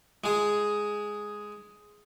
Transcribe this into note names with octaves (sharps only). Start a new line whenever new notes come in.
G#3 G#4